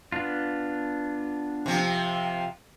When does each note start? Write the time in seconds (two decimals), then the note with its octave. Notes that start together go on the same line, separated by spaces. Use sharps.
0.12 B3 D4 F4
1.66 C3 F3